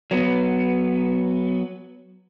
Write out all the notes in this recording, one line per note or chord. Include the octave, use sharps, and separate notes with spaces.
F#3 B3